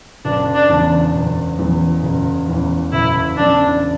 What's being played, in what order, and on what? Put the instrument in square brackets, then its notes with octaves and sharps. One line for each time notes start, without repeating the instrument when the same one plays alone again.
[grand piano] F#1 [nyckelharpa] D4
[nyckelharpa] D4
[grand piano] E2 C#3 E3
F#1
E2 C#3 E3
F#1
E2 C#3 E3
[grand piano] F#1 [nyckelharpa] E4
[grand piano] E2 C#3 E3 [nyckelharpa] D4